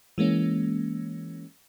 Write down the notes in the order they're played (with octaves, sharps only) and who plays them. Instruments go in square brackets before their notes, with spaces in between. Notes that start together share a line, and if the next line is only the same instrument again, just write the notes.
[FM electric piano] E3 G#3 A#3 C#4